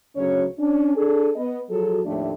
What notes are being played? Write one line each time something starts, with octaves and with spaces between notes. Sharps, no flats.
D2 C#3 F#3 C#4 C#5
C#4 D4
D4 G#4 A4
B3 D#5
F3 F#3 F#4 G#4 A4
D#2 A2 C3 F3 A3 D4